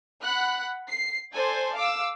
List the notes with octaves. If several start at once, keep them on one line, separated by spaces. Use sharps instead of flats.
F#5 B5 F#6
C7
A4 C5 D5 G#5
F5 D6 E6